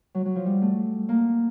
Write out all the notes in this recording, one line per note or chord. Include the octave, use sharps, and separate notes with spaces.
F#3
F#3
F3
G3
A3
A#3